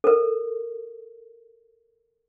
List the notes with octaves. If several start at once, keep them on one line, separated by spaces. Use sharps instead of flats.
A4 A#4